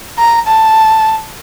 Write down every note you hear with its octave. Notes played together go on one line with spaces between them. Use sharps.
A#5
A5